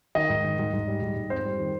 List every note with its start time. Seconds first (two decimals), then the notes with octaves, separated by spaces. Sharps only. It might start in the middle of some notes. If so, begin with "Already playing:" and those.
0.15 D#3 D#5
0.30 G#2
0.44 D#3
0.59 G#2
0.73 G#2
0.88 G3
1.02 G#2
1.16 G#2
1.30 F2 C5
1.45 G3
1.59 D#3